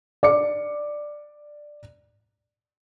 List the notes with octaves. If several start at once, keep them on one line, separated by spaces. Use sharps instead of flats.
D5 D6 C#7